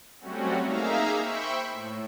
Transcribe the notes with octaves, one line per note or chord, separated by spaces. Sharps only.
F#3 G3 A3 C4 C#4 F#4
A#3 D#4 G#4 E5 F5 A#5
C5 E5 G5 B5 C#6
A2